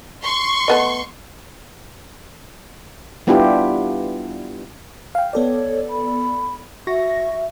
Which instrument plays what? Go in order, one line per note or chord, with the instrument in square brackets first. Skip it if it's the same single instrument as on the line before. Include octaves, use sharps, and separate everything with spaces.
[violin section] C6 C#6
[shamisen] A3 B3 D#5
[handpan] G3 B3 D4 E4 F4 G4
[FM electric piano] F5 G5
[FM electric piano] B3 A4 D5 [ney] C#5
[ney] B5
[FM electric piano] F#4 C#6 A#6 [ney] E5